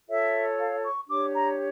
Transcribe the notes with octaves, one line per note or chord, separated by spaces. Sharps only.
F4 A4 C#5 E5
F5
C#6
D4 G4 C#5 D6
A#5